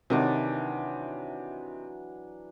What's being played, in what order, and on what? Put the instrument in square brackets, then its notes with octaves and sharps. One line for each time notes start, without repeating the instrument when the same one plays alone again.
[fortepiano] C3 D#3 [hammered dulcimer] E3 F#3 D4